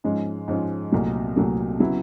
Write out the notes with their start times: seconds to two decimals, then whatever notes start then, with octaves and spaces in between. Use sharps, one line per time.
0.04 G#2 F3 G#3 C#4
0.48 G#2 F3 G#3 C#4
0.92 C2 A#2 F#3 A3
1.36 C2 A#2 F#3 A3
1.80 C#3 F#3 B3 E4